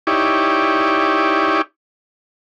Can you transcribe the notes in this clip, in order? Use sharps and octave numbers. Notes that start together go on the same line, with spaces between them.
D#4 E4 G4 C#5 D5